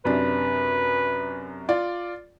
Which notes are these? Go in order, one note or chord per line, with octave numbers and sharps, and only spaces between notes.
F#2 C3 D4 B4
F4 D5